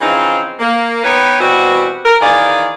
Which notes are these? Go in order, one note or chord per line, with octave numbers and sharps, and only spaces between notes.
C#3 E3 F3 C4 D#4
A#3
B3 D#4 G4 B4 C#5
B2 E3 G3 C4 F#4
A#4
D#3 E3 A#3 G#4 D5 F5